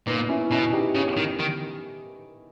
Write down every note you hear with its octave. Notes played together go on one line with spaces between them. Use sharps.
A#2 B3 D#4
C#4 E4
B2 C#4 E4
D#4 G4
C#3
D#3
D#3